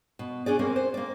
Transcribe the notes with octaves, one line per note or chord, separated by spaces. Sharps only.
B2
C#4 D4 G#4 D5
A#3 C4 C#4 A#4
C5
A#3 D5